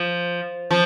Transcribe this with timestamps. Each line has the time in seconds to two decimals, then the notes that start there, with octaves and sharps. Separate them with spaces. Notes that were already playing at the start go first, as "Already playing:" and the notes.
Already playing: F3
0.71 F3